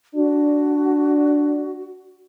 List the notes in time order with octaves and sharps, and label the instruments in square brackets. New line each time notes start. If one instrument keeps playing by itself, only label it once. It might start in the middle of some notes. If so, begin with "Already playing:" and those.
[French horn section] D4 [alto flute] F#4